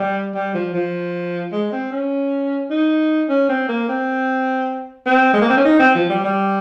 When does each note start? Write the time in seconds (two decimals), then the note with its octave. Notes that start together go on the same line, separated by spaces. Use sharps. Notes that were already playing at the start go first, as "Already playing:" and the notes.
Already playing: G3
0.34 G3
0.54 F3
0.74 F3
1.52 G#3
1.72 C4
1.92 C#4
2.70 D#4
3.29 C#4
3.49 C4
3.68 A#3
3.88 C4
5.06 C4
5.33 G#3
5.41 A#3
5.50 C4
5.57 C#4
5.65 D#4
5.79 C4
5.95 F3
6.09 G3
6.24 G3